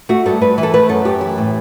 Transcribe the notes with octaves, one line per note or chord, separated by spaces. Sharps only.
A3 F#4
G2 A4
G2 B4
E3
A4
A3 B4
F#2 A4
F#2 G4
E3
A2